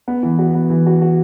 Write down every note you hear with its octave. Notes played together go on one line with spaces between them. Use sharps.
B3
E3
F#4
B3
E3
F#4
F#4